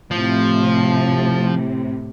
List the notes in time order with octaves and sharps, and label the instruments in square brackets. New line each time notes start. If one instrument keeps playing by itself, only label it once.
[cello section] A2 C3 [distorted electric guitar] F3